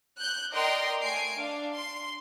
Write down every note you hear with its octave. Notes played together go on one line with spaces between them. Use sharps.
F#6 G6
A#4 D5 D#5 G5 C6
A3 G#5 C7 D7
D4 F5
C6